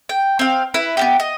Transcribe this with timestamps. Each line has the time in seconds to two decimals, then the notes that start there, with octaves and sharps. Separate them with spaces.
0.09 G5
0.39 C4 F5
0.74 E4 B4
0.97 B3 C#4 G4
1.20 D#5